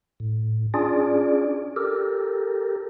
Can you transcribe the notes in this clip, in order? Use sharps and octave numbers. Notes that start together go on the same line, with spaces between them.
A2
C#4 D4 F4 G#4 D5
G4 A4 A#4